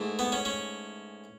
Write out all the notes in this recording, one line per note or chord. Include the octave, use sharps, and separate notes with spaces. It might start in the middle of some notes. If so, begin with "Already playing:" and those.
Already playing: G#2 E3 A3
B3
C#4
C#4